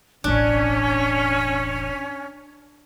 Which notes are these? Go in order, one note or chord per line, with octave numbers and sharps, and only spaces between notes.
E1 A1 C#4 D4